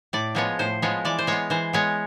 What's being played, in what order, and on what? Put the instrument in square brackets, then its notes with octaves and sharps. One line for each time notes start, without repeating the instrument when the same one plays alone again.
[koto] A2 D5
F3 G#3 B3 C#5
A2 C5
F3 G#3 B3 C#5
E3 D5
C5
G#3 B3 C#5
E3 C5
G#3 B3 C#5